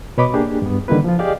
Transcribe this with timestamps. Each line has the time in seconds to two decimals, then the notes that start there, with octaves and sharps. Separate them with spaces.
0.18 B2 B4 C#5 D#5 B5 D6
0.34 A#3 D4 G4 G#4
0.62 G2 B3
0.88 D3 D#3 G3 A#3 E4 B4
1.04 F3 F4
1.19 G4 G#4 D5 D#5 F5